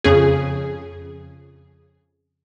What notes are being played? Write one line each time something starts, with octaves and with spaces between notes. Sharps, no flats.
F2 C#3 G#4